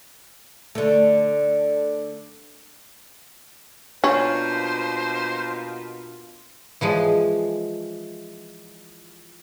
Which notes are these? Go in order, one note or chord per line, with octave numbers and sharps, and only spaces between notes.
D3 A3
B2 A#3 C#4 D4 F4 C5
E3 F3 G#3